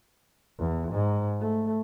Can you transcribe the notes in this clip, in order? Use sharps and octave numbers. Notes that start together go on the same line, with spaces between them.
E2
G#2
A3